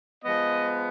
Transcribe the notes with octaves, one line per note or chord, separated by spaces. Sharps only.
F3 G#3 B3 D#5